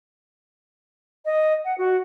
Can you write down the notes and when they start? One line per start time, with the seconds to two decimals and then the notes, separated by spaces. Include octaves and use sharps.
1.25 D#5
1.65 F#5
1.78 F#4